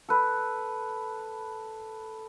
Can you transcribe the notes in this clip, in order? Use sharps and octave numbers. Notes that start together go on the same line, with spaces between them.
A4 B4